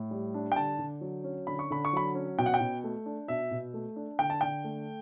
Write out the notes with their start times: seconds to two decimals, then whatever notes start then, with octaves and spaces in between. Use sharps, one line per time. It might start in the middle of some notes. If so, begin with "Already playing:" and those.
Already playing: A2
0.11 G3
0.34 D4
0.52 G5
0.56 D3 A5
0.79 D3
1.01 F#3
1.24 C#4
1.47 D3 B5
1.59 C#6
1.70 D3 B5
1.85 C#6
1.93 F#3 B5
2.15 C#4
2.38 B2 G5
2.46 F#5
2.54 G5
2.60 B2
2.84 A3
3.06 D4
3.28 B2 E5
3.51 B2
3.74 A3
3.96 D4
4.19 D3 G5
4.30 A5
4.41 D3 G5
4.64 A3